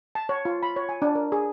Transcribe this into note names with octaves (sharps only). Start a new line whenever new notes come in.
A5
C#5
F4
B5
C#5
G#5
D4
A#4
G#4